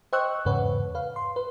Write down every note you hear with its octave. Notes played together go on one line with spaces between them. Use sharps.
C5 D#5 G5 C#6 E6 F#6
E2 G#2 C#3 B4 C#5 F#5
B4 F5
C6
B4